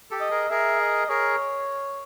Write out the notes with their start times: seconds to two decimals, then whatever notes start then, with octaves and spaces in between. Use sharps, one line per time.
0.11 G4 A4
0.21 D#5
0.30 G#4 A#4
0.50 G#4 A#4 E5
0.80 D#5
1.09 G#4 A#4 C#5